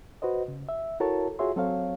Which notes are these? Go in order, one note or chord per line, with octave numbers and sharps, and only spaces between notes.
F#4 B4 C5 D#5
C#3
E5
E4 F#4 A4 A#4 C#5 A5
F4 F#4 G#4 C#5 E5 C6
F#3 C4 A4 C#5 F5